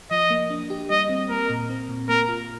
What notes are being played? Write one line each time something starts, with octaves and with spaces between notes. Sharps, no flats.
F3 D#5
A#3
D4
G4
G3 D#5
C4
A#3 A#4
A#2
C4
A#2
A#3 A#4
F4